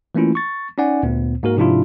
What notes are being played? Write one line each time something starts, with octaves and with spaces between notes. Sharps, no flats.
E3 A3 A#3 C#4 E4 F4
C#6 A6
C#4 D#4 D5 F#5 G#5
D2 A#2 B3
G#2 A#3 F#4 A#4
G#2 C3 F3 D4 E4 F4